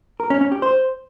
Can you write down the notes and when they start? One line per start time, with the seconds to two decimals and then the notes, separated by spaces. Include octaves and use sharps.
0.20 A#4
0.30 C#4
0.41 C#4
0.52 G4
0.62 C5